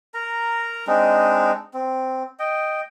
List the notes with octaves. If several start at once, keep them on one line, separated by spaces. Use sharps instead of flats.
A#4 A#5
G#3 C4 D4 D#4
C4
D#5 G5